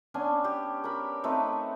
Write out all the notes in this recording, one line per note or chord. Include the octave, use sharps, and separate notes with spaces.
B3 C#4 D4 G#5
G4
A#4 B5
A3 C4 D#4 B4